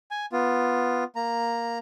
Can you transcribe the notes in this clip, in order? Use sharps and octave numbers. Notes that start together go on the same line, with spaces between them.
G#5
B3 F4
A#3 A#5